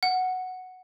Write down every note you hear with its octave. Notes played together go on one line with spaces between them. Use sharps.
F#5